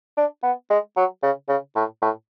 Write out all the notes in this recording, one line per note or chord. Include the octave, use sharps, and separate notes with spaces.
D4
B3
G#3
F#3
C#3
C#3
A2
A2